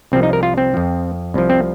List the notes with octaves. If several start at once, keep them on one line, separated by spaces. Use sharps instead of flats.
C2 C3 F3 C4
D#4
A#4
F4
C4
F2 F3
C2 C3 F3
C4